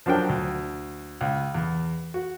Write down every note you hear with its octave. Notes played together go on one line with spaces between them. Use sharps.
F3 F#3 D4 A#4 G5
D2
C#2
E2
F#4